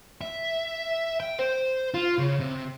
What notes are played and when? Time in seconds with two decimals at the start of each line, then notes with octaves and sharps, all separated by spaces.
0.21 E5
1.20 G5
1.39 C5
1.94 F4
2.18 C#3
2.39 C3